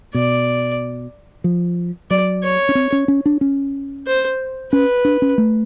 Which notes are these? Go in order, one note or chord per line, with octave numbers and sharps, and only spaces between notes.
B2 D5
F3
F#3 D5
C#5
C#4
C4
C#4
C#4
D4
C#4
C5
C#4 B4
D4
C#4
A3